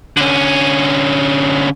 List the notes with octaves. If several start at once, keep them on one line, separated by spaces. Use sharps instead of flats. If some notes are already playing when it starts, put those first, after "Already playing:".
D3 C#4